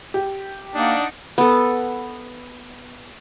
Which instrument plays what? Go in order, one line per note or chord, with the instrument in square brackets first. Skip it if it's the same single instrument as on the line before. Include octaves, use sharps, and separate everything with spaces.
[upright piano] G4
[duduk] A#3 [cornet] D4 [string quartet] D#4 D5 F#5
[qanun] B3 A4